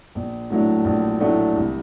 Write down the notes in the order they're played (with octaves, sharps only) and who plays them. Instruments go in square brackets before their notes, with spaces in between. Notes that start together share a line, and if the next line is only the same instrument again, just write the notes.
[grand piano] A#1
A2 F#3 A3 D4
A#1
A2 F#3 A3 D4
C2